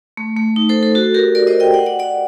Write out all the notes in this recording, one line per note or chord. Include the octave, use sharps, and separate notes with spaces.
A3
A3
D#4
A4 C5
A4 C5
F#4 A4
G4 A#4
A#4 D5
C5 D#5
D#5 G5
D5 F#5
D5 F#5
D5 F#5